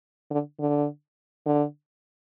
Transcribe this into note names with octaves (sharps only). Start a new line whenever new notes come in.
D3
D3
D3